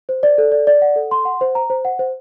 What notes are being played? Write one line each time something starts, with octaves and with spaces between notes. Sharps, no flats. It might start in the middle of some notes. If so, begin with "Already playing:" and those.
C5
D5
A4
D5
D5
F#5
A4
C6
F#5
C5
A#5
C5
F#5
C5